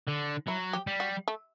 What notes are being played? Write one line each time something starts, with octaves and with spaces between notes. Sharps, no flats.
D3
F#3 E4
G4
G3
F#4
A3